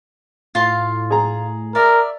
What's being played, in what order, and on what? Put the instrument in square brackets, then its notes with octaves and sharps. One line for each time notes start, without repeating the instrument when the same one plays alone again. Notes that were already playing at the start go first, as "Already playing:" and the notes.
[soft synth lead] A2 [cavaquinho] F4 F5 C6
[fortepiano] G#4 A#5
[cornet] A#4 [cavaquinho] D5 E5